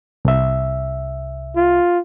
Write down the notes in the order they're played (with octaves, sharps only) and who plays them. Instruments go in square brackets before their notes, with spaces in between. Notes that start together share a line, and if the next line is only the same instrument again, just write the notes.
[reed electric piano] C2 E5
[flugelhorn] F4